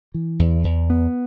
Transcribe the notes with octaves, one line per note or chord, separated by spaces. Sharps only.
E3
E2
E2
B3